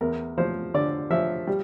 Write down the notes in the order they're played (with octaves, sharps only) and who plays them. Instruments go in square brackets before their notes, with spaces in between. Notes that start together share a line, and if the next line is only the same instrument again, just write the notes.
[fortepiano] E2 A#4
F3 C5
D3 D5
F3 E5
G3